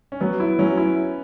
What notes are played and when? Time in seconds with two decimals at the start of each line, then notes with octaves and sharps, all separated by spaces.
0.12 C#4
0.21 F#3 B3
0.40 E4
0.59 F#3 C#4
0.77 E4